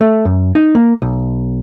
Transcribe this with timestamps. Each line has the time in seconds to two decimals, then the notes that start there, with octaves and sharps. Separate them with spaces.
0.01 A3
0.25 F#2
0.55 D#4
0.75 A#3
1.02 B1